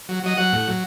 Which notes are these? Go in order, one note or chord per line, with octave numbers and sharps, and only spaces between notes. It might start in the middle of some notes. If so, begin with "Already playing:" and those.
F#3
F#3 D#5
F#3 F#5
A2
F#3